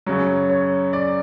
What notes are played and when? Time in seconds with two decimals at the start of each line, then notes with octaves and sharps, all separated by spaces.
0.06 F#2 C#3 F#3 C#5
0.50 C#5
0.93 D5